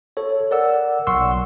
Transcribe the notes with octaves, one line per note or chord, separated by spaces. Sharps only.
A4 C#5
A#4 D5 F#5 E6
B1 F#5 C6 C#6 E6